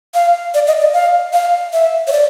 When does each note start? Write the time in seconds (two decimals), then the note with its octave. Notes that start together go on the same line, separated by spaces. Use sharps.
0.14 F5
0.54 D5
0.67 D#5
0.81 D5
0.94 F5
1.33 F5
1.73 E5
2.08 C#5
2.12 D5